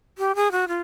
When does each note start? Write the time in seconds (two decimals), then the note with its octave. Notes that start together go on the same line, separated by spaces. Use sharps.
0.18 G4
0.35 G#4
0.51 F#4
0.68 F4